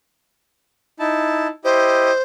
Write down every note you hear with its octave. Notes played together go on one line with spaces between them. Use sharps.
D#4 E4 A5
E4 G4 C5 D#5